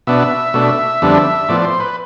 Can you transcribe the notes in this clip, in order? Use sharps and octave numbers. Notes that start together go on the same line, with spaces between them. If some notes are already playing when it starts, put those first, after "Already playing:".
B2 B3 D4 E5
B2 A3 D4
F2 D3 G3 B3 D4
A2 F3 B3 D5
C5
B4